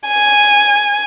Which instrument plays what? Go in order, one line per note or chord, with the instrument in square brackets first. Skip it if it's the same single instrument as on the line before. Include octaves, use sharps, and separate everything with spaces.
[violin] G#5